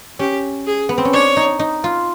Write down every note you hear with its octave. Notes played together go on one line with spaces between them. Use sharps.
C#4 G4
G#4
B3
C4
C#4
D4 C#5
D#4
D#4
F4